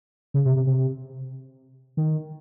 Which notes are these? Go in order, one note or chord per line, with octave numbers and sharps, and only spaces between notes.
C#3
C3
C3
C3
D#3